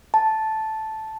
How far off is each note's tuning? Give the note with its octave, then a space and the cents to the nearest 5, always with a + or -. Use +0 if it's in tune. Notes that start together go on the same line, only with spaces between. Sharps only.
A5 -5